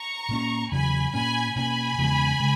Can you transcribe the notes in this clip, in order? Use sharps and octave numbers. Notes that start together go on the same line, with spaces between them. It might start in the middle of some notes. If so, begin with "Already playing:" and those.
Already playing: A#5 C#6
A#2 A#3 C#4
E2 C#3 F#3 G#5 B5
A#2 A#3 C#4 G#5 B5
B2 A#3 C#4 G#5 B5
E2 C#3 G#3 B3
C#3 G#3